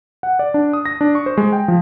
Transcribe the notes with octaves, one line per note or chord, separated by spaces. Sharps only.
F#5
D5
D4
D#6
A#6
D4
C#6
C5
G#3
G5
F3